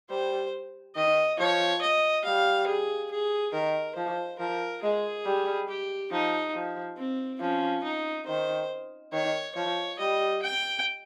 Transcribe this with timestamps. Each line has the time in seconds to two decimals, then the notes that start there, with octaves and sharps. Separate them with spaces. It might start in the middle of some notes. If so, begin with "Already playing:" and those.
0.10 G3 C5
0.96 D#3 D#5
1.38 F3 C#5
1.81 D#5
2.24 G3 F5
2.67 G#4
3.11 G#4
3.53 D#3 A#4
3.96 F3 C5
4.39 F3 A#4
4.82 G#3 G#4
5.25 G3
5.68 G4
6.11 F3 D#4
6.55 F3
6.97 C4
7.41 F3 C#4
7.84 D#4
8.27 D#3 C5
9.12 D#3 C#5
9.55 F3 C#5
9.98 G3 D#5
10.42 G5